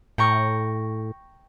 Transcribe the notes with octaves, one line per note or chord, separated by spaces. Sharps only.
A2 G5 A#5 C#6